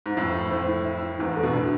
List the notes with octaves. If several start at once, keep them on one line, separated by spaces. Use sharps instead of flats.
G#2
F2 A2 E4
E4
F2 A2 C5
E4
E5
E4
E2 G#2 E4
A4
B2
A2 D4